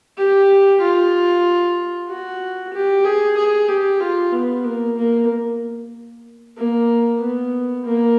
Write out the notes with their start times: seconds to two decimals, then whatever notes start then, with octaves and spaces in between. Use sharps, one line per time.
0.17 G4
0.81 F4
2.09 F#4
2.73 G4
3.05 G#4
3.37 G#4
3.69 G4
4.00 F4
4.32 B3
4.64 A#3
4.97 A#3
6.57 A#3
7.20 B3
7.85 A#3